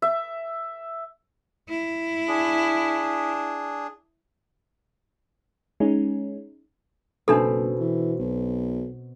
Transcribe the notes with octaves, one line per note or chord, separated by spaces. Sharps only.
E5
E4
D4 G#4
G#3 C#4 D#4
F#1 B2 C4 D4 D#4 A4
E3
B1